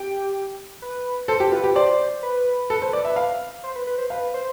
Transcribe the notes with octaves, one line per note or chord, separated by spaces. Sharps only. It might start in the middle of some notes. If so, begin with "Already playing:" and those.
Already playing: G4 G5
B4
A4 C5
G4
F4 B4
G4
C5 D5
B4
A4
C5
D5
E5
F5
C5
B4
B4
C5
B4 F5
C5